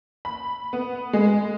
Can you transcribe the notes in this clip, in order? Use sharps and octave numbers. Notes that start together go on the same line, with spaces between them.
B5
B3
G#3